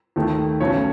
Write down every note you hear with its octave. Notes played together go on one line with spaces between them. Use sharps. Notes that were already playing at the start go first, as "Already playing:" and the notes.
D#2 D#3 A3
B1 B2 A3 C#4 C#5